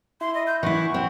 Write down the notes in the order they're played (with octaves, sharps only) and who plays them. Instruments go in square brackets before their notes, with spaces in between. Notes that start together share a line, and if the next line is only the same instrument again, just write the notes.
[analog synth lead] E4 [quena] C6
[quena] D#5
G6
[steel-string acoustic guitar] E3 E4 [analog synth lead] F#5 [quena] C#6
[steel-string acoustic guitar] C4